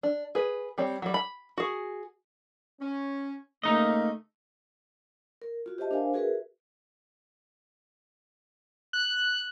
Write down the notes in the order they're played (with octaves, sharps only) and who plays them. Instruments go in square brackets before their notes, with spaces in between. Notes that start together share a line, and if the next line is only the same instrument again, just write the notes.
[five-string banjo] D4
G#4 B4
G3 C4 C#5
F#3 G3
B5
F#4 G#4
[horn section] C#4
[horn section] C#3 A3 [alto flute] A#3 [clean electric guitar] D#4 D#5
[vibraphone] A#4
F4 F#4
G4 C5 D#5 E5 A5
D4 A#4 C5 F5 G#5
F#4 G#4 A#4 B4 E5
[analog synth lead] F#6